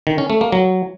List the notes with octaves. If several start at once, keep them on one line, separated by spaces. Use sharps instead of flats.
D#3
C#4
A3
A#3
F#3